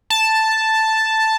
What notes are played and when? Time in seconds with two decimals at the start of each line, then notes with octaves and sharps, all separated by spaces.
0.10 A5